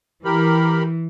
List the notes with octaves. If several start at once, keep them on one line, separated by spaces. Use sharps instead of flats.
E3 G4 A#4 B5